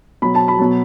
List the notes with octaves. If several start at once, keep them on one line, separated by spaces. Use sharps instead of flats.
B2 F#3 B5
A5
B5
B2 F#3